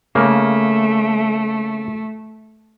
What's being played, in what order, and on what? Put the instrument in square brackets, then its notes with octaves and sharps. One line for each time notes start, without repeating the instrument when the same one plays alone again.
[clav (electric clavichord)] C#3 A#3 [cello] A3